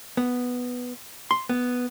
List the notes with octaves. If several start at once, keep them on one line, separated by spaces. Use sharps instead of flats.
B3
C6
B3